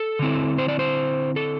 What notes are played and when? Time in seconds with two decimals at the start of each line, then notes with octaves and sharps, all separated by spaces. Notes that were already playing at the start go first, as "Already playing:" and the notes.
Already playing: A4
0.19 D3 C4 E4
0.58 C5
0.68 D5
0.79 C5
1.36 A4